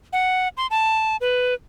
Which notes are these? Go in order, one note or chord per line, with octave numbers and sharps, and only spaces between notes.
F#5
C6
A5
B4